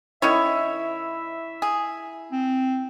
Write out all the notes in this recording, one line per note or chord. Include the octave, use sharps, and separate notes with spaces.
D#3 C#4 E4 C#5 E5
G#4
C4